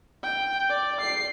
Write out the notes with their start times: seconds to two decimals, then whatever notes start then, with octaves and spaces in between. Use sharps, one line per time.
0.23 G5
0.70 D5
1.01 C7